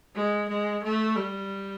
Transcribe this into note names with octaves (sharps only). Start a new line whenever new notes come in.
G#3
G#3
A3
G3